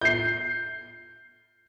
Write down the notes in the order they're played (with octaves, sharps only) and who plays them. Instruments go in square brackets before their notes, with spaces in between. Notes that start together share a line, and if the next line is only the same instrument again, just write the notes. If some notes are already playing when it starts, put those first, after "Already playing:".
[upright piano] G6 C7